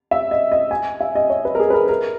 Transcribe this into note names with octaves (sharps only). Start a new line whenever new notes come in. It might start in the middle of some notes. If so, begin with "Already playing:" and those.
E5
D#5
D#5
G#5
E5
D#5
C#5
B4
A#4
G#4
B4
A#4
A#4